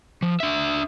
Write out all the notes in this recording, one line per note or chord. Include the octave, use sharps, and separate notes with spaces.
F3
D4 E5